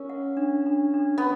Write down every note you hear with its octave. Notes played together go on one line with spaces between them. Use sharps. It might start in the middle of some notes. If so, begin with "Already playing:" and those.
Already playing: C#4 A#4
F#5
D4
D4
D4
B3